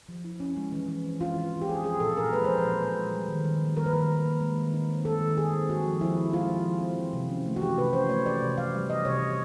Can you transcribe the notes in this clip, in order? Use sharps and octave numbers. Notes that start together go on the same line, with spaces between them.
F3
E4
C#4
G#3
E3
E3
C4
G#3 F4
E3
E3
G4
C4 G#4
F3 G#4
A#2 A4
A#2 A#4
G#3 B4
F3 C5
B4
A#2
A#2
G#3
G3
D#3
D#3
A#3
G3 A#4
B4
D#3 A#4
D#3
A#3
G#3
D#3
D#4
C4
G#3 A4
D#3
D#4 G#4
C4
G#3 F#4
F3
F3 E4
C4
G#3 F4
F3
F3
C4
E3
C3
C#4
A3
F#4
E3 G4
C3 B4
C#4 C5
A3 C#5
E3 D5
C3
C3 F5
G3
E3 D#5
C3 C#5
C3